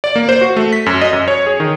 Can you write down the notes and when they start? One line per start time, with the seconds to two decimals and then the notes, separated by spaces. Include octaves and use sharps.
0.04 D5
0.16 A#3
0.29 C5
0.41 F#4
0.57 A3
0.73 B6
0.86 F#2
1.01 D#5
1.13 F#2
1.28 C#5
1.47 G#4
1.60 D#3